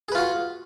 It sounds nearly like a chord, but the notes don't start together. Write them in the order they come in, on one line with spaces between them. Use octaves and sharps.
G#4 B4 F4 F#4